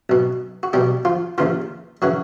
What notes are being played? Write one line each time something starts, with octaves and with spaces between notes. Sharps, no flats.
B1 B2
F#4
B1 B2 G3 G4
F3 F4
D#2 C#3 E3 F3 F4
C#3 E3 F#3 F#4